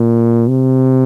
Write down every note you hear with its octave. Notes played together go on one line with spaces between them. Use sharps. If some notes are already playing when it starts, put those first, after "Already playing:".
Already playing: A#2
C3